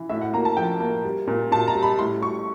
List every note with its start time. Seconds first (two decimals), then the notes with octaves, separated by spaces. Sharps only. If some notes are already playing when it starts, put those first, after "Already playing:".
Already playing: E3
0.09 A2 E5
0.21 F#5
0.33 A#3 A#5
0.45 A5
0.57 F3 G5
0.80 A#3
1.04 G3
1.28 A#2
1.52 A#2 A5
1.68 A#5
1.75 G3
1.83 B5
1.99 A2 C6
2.22 G3 C#6